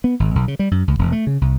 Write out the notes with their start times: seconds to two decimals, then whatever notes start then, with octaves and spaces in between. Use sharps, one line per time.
0.04 B3
0.20 G#1
0.35 B1
0.48 C#3
0.59 G3
0.71 F#2
0.88 C#2
0.99 E1
1.12 A3
1.27 C#3
1.41 C2